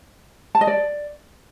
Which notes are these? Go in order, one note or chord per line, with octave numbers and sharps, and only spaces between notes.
A5
D#5
D5